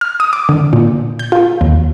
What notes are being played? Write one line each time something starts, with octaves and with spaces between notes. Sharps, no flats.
F6
D#6
D6
D3
A#2
G6
F4
D#2